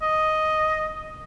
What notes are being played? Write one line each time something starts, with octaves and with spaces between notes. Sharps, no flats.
D#5